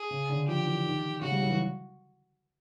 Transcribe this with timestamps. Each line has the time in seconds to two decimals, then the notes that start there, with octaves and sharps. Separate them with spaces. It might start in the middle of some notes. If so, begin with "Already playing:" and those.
Already playing: G#4
0.11 C#3
0.29 D3
0.48 F3 G4
0.66 E3
0.85 D#3
1.21 C#3 F#4
1.31 G3
1.41 F#3
1.49 E3